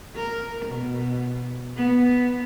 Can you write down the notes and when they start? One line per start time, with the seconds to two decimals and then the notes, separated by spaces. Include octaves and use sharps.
0.16 A#4
0.66 B2
1.77 B3